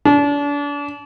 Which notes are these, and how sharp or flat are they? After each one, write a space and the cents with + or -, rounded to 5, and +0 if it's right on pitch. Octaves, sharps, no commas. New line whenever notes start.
D4 -35